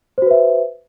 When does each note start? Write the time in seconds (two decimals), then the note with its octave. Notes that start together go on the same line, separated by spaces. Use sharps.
0.18 C5
0.22 F#4
0.26 B4
0.31 E5